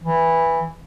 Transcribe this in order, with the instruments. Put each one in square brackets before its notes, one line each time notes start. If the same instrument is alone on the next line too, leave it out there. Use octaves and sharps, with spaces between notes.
[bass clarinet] E3